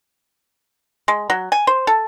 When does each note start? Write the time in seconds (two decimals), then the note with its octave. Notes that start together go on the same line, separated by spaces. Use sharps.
1.08 G#3
1.30 F#3
1.52 G#5
1.67 C5
1.87 A4